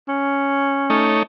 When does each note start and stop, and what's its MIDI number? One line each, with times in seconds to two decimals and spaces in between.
0.08 1.19 61
0.90 1.23 57
0.90 1.23 63
0.90 1.23 73